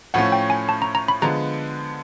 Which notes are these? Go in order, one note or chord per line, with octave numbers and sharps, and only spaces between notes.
A2 F3 A3 C#4 F#5
G5
G#5
A5
A#5
A#5
B5
D3 F3 G#3 B3 A#5